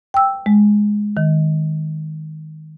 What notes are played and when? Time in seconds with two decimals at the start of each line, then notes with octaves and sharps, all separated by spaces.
0.14 G5 E6
0.46 G#3
1.17 D#3